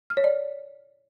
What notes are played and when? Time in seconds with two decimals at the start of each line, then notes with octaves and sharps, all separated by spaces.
0.10 F6
0.17 C#5
0.24 D5